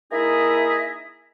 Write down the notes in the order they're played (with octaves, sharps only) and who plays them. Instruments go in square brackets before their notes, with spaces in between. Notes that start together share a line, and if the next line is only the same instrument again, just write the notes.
[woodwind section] A#3 D#4 E4 G#4 D#5 E5